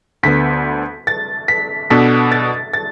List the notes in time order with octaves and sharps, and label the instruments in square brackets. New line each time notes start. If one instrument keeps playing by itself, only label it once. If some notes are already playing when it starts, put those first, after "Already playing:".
[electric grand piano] D2 D3 B3 [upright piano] B6
[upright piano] A6
B6
[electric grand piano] B2 B3 D4 A4 [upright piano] B6
[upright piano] A6
A6